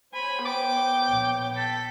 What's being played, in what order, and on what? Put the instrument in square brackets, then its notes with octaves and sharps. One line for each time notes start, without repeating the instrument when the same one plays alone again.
[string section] C5 C#5 [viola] G#5 [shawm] B5
[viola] B3 G5 [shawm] D6
[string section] A#1 C#5
[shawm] A4 [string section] B6